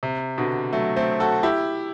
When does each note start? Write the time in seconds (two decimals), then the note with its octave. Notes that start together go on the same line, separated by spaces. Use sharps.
0.03 C3
0.38 B2 D3
0.73 F#3 A3
0.96 A3 C4
1.20 F#4 A4
1.43 E4 G4